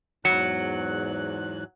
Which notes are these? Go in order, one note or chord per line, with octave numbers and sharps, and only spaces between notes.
E2 G#2 F#3 F#6 C#7